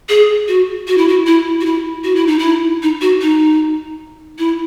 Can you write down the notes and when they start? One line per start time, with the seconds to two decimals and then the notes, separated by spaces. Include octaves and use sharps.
0.09 G#4
0.48 F#4
0.87 F#4
0.98 E4
1.08 F#4
1.27 E4
1.61 F#4
1.66 E4
2.04 F#4
2.16 E4
2.27 D#4
2.39 E4
2.83 D#4
3.01 F#4
3.21 D#4
4.38 E4